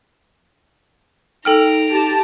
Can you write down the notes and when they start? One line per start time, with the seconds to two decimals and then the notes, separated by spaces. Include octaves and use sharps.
1.45 D#4 A4 G5 A#5 F6 D7
1.89 G4 A5